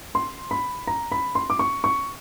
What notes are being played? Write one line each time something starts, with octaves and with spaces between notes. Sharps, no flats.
C6
B5
A#5
B5
C6
D6
C#6
C#6